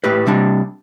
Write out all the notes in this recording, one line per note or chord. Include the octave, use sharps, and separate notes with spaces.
A2 G4 B4
C3 G3 D4